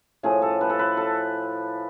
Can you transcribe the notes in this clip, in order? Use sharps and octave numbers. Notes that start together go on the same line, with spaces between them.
A2 F3 A3 G#4
A4
B4
A4
B4
A4